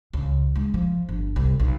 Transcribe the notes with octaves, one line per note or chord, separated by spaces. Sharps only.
C#2
G#3
F3
G1
C2
B1